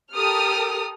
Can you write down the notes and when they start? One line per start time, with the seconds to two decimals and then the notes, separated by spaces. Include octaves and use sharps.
0.13 G4 A4 A#4 D#6 F6